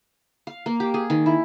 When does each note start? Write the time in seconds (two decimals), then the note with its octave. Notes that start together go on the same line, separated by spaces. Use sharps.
0.47 F5
0.66 A#3
0.80 G4
0.94 G#4
1.10 D#3
1.26 E4